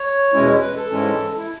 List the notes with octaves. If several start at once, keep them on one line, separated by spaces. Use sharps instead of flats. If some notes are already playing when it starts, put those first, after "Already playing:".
Already playing: C#5
E2 B2 G#3 C#4 E4
B4
A4
G#2 E3 G#3 C#4 E4
E4